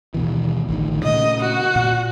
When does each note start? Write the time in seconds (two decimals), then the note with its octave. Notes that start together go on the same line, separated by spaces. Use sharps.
0.14 D#2 B2 E3
0.68 A1 D2 D#3
1.04 A#2 C#3 A3 D#5
1.40 F#4
1.76 A#2